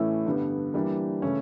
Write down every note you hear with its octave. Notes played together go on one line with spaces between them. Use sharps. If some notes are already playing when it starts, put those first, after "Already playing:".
Already playing: A2 E3 A3 C#4 E4
G2 D3 G3 B3
E3 G3 A#3 D4 G4
C#3 E3 A3 C#4